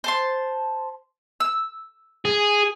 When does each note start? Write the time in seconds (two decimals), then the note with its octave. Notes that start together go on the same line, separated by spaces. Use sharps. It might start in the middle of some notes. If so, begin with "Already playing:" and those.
0.04 C5 A5 C6
1.40 E6
2.25 G#4